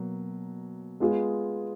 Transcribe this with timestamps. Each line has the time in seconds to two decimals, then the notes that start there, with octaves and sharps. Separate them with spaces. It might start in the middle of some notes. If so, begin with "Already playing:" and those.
Already playing: B2 F#3 A#3
1.00 G#3 B3 F4 G#4